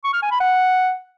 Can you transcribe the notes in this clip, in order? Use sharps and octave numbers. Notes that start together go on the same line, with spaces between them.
C#6
F6
G#5
B5
F#5